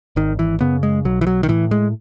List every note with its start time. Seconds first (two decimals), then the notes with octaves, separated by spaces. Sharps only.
0.16 G#1 D#3
0.39 E3
0.60 F#2 C#3 B3
0.83 G#3
1.05 B1 F#3
1.21 E3
1.27 F#3
1.43 D#3
1.48 A2 E3
1.71 G#3